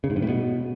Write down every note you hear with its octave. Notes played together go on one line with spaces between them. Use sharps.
C#3
G#2
G2
A2
B2